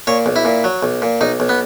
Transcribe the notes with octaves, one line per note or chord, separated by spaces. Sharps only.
A#2 C#5
B1
E4
A#2
F#3
B1
A#2
B1 D#4
B1
B3